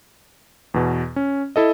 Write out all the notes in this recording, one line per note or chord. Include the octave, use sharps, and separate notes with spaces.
E2 B2
C#4
E4 A4 D#5